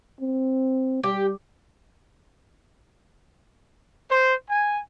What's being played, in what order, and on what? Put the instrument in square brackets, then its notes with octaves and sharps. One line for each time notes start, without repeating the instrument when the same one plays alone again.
[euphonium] C4
[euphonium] G3 [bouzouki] G4
[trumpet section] C5
G#5